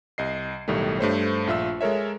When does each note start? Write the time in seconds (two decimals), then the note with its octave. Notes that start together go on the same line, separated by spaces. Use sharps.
0.18 C2 D#5 C7
0.68 B1 A2 D#3 G3 A3
0.99 G2 A3 C5 C#5
1.47 A#1 F4 E5 E6
1.81 G#3 A4 A#4 C#5 E5